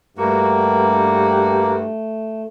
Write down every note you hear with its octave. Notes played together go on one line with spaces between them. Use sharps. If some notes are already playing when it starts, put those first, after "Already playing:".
G2 A3 A#3 F#4 G4